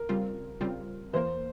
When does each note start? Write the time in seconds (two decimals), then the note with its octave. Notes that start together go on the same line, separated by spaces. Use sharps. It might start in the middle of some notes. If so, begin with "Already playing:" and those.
Already playing: A#4
0.09 C#3 G3 C4 F4
0.61 C#3 G3 C4 F4
1.13 E2 E3 A#3 C5